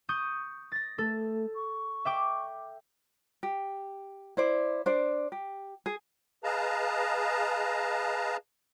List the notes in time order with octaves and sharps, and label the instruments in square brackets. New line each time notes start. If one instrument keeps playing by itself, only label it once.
[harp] C#6 D#6 G6
A6 A#6
[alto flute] A3 [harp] A4
[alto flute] C#6
[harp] E5 G5 D6
[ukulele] G4
E4 C5 D5
D4 C5 D5
G4
G#4
[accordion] G#4 B4 D#5 F5 A5 A#5